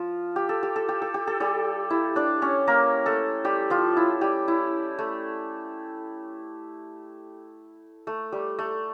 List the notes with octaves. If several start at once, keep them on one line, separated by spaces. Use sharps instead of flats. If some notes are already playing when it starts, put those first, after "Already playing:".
Already playing: F3 F4
G4
A4
G4
A4
G4
A4
G4
A4
G3 G4
E4
D4 D5
C#4 C#5
A#3 A#4
A3 A4
G3 G4
F3 F4
E4
G3 G4
E4
A3
A3
G3
A3